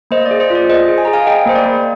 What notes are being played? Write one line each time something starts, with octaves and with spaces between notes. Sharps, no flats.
A#3 C5 D#5
D5
G#4
C5
F4
D5
G#4 C5 D#5
G#4
G#5
A#5
G#4
F5 G#5
G#4 D#5 G5
A#3 C5
D5
A#3